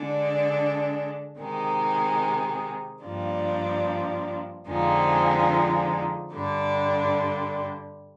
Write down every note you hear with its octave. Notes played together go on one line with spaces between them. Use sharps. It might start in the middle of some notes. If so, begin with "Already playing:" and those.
Already playing: D3 G#3 D4
C3 D#3 G#3 D#4
G2 F3 A#3 D4
F2 D3 F3 G#3 D#4
G2 D3 G3 D4